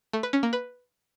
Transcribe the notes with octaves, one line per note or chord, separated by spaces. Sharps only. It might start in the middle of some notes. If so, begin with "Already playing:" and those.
A3
B4
C#4
A#3
B4